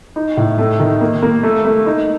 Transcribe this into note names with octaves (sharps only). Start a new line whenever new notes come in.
D#4
A2
A3
D#3
A#3
A#3
A3
A3
D#4